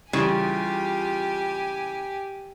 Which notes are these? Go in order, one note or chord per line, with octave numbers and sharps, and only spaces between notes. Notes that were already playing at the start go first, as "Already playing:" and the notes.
C#3 E3 G3 F4 G4 G#5